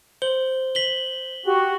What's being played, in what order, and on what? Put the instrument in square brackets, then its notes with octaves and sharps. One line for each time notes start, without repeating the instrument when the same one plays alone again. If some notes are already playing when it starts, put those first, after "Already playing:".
[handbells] C5 [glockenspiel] G7
[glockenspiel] B6 F#7 G7
[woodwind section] F#4 [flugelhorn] G4